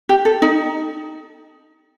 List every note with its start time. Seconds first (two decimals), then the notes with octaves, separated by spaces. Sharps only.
0.09 G4
0.25 A4
0.42 D#4